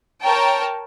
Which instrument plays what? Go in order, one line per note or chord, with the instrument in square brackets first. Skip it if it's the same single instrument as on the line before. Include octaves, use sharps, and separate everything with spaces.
[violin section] A#4 C#5 G5 A5